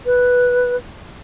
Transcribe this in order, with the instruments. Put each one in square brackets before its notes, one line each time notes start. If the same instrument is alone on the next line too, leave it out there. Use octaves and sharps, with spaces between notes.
[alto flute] B4